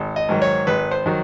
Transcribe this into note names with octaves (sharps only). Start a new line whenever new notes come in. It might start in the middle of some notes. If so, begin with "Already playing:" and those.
Already playing: G#1
D#5
G#2 D#3 F#3
C#5
G#1 B4
C5
D#3 F#3